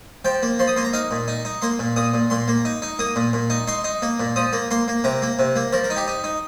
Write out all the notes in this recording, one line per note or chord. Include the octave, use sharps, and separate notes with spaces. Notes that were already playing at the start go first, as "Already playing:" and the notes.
F3 G5
A#3
F3 C6
D#6
A#3 C6
A#5
D#4 F5
A#2
D#4
D#4
A#3 C6
A#2
A#2 D#6
A#2
A#2 C6
A#3
D#4
D#4
A#3 D#6
A#2
A#2
D#4
D#4 C6
D#4
A#3
A#2
F3 D#6
A#3
A#3 C6
A#3
C3 A#5
A#3
C3
A#3
F3 A#4
A#4
D#4
G4
D#4
D#4